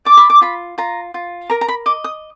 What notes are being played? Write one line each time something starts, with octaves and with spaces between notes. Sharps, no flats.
D5 D6
B5
D6
F4 B5
F4 A#5
F4
A#4 A#5
A#5
B5
D#5 D6
D#6